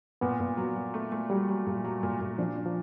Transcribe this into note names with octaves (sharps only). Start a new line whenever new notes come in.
A#2 B3
A#2
F#3
F#3
A3
A3
F#3 G3
F#3
A#2
F#3
A#2
A#2
F3 D4
D4
F3